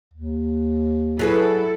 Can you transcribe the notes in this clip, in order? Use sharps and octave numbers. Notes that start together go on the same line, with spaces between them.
D#2
F#3 E4 G#4 A4 B4